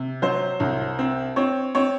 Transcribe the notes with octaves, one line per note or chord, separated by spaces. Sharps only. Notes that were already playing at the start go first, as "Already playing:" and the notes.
Already playing: C3
F#3 C5
C2
C4
C4 C#5
C4 C#5